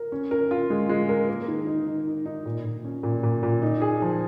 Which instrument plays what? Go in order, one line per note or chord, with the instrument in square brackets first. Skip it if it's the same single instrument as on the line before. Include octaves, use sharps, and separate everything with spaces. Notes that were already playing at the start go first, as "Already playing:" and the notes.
Already playing: [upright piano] A#4
C#4
A#4
F4
G#3
G#3
A#4
A#3
D#3
D#4
D#4
D#4
D#4
A#2
A#2
C#4
A#2
A#2
A#2
D#4
G#4
F3